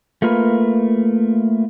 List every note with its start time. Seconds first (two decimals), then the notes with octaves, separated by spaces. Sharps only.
0.22 A3 A#3 F4 A#4 B4